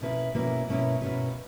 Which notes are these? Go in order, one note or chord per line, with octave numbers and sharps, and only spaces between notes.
B2 A#3 C#4 E4 B4
B2 A#3 C#4 E4 B4
B2 A#3 C#4 E4 B4
B2 A#3 C#4 E4 B4